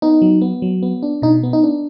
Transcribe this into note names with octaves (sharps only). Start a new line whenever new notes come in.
B3 D#4
F#3
B3
F#3
B3
D4
B2 D#4
B3
D#4
D4